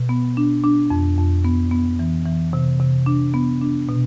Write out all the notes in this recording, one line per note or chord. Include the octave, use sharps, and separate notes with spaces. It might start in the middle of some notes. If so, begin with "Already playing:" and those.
Already playing: B2
B3
D4
D4
F2
F2
B3
B3
E3
E3
C3
C3
D4
B3
D4
B2